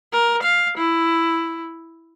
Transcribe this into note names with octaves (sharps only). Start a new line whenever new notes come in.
A#4
F5
E4